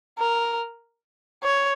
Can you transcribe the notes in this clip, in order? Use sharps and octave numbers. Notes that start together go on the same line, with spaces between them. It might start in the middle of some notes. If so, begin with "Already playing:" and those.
A#4
C#5